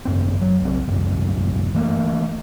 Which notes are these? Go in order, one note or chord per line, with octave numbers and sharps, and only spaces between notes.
G#1 F#2 C4
F#3
B1 C4
G1 C2 F#2
E3 A3 A#3